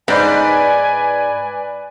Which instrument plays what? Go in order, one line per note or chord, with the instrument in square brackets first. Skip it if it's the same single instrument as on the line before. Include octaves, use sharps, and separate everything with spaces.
[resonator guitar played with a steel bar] G#2 [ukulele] D#4 C5 D#5 [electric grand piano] B4 D5 B5 [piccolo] G#5